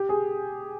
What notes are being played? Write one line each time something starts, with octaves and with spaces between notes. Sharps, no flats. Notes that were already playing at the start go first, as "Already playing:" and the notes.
Already playing: G4
G#4